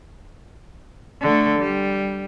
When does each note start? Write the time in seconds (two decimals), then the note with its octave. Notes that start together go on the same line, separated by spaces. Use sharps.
1.22 D3 A3
1.58 G3